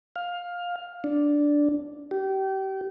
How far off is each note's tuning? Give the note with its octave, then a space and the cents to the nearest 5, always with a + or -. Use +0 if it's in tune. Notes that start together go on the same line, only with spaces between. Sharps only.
F5 +15
D4 -5
G4 -30